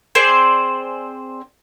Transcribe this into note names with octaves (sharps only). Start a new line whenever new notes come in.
C4 G#4 C5 D5